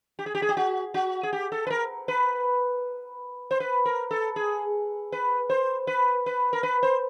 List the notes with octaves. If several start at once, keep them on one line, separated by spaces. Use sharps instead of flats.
G4
G#4
G4
G#4
G4
F#4
F#4
G#4
G4
A4
B4
A#4
B4
C5
B4
A#4
A4
G#4
B4
C5
B4
B4
A#4
B4
C5